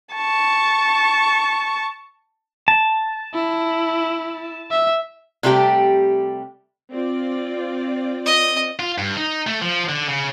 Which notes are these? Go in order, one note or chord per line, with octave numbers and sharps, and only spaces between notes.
A5 C#6
A5
E4
E5
C3 G3 A3 G4 G5
C4 F4 D5
D#5
F4
G2
D#4
A3
F3
D3
C#3